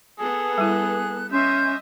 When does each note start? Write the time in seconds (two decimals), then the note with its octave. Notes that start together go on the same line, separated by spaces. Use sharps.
0.19 B3 G#4 A4
0.58 G3 E4 F#6
1.30 C#4 D#5 E5 C6 G6